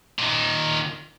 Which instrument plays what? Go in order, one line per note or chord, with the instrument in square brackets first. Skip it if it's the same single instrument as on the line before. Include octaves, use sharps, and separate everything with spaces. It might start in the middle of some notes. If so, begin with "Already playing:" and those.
[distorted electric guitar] A#2 D#3